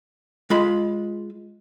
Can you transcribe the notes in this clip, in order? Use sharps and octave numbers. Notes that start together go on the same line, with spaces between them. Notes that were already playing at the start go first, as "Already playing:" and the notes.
G#3 F4 B5